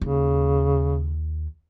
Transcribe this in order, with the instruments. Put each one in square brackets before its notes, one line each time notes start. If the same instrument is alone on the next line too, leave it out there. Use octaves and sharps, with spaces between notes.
[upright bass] D#2 [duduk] C#3